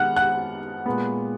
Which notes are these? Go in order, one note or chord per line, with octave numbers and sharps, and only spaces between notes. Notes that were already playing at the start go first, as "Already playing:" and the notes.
Already playing: D#3 G#3 B3 F#5 F6 F#6
F#5 F#6
A#2 G#3 B3